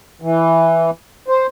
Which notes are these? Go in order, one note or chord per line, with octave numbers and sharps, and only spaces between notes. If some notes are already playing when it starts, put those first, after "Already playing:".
E3
C5